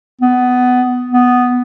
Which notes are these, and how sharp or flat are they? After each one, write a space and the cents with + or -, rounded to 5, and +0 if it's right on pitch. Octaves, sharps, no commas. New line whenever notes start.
B3 +15
B3 +5